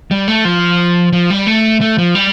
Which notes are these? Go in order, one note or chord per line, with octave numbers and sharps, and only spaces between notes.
G3
A3
F3
F3
G3
A3
A3
F3
G3